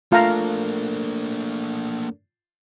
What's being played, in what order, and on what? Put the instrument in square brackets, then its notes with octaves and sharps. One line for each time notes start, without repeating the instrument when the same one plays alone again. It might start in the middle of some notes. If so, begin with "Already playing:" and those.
[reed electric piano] A3 A4 A#4 [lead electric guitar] A#3 D4 [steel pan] F4 F5 A#5